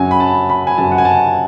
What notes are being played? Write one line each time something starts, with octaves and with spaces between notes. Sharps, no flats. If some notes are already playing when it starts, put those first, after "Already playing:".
Already playing: F#2 C#3 F#3 G#5
B5
A5
B5
G#5
F#2 C#3 F#3 A5
F#5
G#5
A5